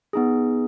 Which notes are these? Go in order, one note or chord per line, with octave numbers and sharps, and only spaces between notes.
B3 D#4 G#4